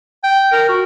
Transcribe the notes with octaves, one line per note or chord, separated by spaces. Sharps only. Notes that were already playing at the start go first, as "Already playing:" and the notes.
G5
A#4
F#4